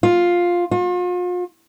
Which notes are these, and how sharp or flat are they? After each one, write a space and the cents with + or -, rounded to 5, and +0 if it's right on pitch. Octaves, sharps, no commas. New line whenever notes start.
F4 +5
F4 +40